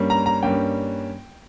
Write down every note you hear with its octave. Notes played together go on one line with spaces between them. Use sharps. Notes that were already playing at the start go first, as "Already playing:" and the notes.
Already playing: G2 G3 A#3 C#4
A#5
A#5
G2 G3 A#3 C#4 G5